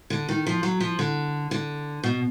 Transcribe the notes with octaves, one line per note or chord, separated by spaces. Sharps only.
D3
D#3
F3
F#3
F3
D3
D3
B2